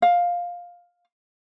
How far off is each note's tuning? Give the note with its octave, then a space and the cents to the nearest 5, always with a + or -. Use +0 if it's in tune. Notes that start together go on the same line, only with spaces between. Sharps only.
F5 +10